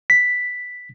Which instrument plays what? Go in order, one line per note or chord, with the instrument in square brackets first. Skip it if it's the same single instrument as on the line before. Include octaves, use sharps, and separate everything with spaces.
[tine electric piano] B6